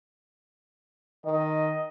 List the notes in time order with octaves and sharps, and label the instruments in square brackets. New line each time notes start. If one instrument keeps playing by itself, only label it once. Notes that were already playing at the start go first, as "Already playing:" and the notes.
[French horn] D#3 [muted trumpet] D#5